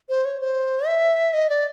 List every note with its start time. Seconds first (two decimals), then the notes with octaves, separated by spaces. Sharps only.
0.09 C5
0.25 C#5
0.40 C5
0.87 E5
1.34 D#5
1.50 D5